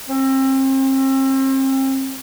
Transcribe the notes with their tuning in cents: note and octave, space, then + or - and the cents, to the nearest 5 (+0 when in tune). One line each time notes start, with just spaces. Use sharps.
C4 +35